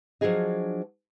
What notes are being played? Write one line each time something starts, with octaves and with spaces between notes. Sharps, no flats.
F3 F#3 D4 F4 G#4 D#5